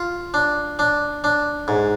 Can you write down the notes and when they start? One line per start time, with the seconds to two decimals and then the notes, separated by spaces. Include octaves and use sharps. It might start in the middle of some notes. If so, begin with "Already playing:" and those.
Already playing: F4
0.34 D4
0.79 D4
1.24 D4
1.68 G#2